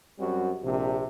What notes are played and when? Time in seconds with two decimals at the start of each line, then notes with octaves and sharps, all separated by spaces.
0.18 F#2 G3 C4 F#4
0.63 A#1 C3